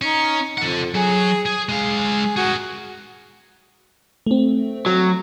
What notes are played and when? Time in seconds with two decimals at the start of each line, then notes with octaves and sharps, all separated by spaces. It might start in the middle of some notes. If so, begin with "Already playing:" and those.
0.02 C#4 D#4
0.58 F2 A4 F#5
0.94 F#3 G#4
1.46 G#4
1.69 G#3 G#4 F5
2.37 F#4 G#4 A#4
4.26 A3 C4
4.86 F#3